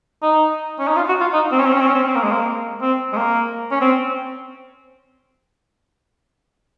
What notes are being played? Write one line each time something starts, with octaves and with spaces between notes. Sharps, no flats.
D#4
C#4
D#4
F4
F#4
F4
D#4
C4
C#4
C4
C#4
C4
C#4
C4
C4
A#3
G#3
A#3
C4
G#3
A#3
C#4
C4